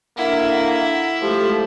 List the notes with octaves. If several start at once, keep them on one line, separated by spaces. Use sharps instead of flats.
A#3 D4 E4 A4 F#5
F3 G#3 A3 G4 A4